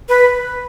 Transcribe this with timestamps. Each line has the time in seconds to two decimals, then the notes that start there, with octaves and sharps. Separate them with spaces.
0.09 B4